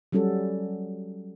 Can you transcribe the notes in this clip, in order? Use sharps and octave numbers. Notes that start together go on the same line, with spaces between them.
F#3 G3 C#4 F#4 A4